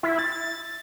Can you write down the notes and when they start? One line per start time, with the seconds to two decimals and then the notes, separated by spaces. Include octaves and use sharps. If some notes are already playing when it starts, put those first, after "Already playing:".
0.03 E4
0.19 A6